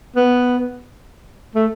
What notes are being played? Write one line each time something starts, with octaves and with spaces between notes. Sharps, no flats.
B3
A3